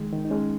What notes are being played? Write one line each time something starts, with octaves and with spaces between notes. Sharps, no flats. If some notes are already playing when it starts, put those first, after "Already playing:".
Already playing: D#3 G#3
D#3
D#4
G#3 C#4